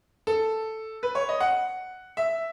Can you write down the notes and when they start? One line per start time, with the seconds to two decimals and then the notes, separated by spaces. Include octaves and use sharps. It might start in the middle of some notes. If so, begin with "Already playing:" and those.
0.27 A4
1.03 B4
1.15 C#5
1.29 D#5
1.40 F#5
2.17 E5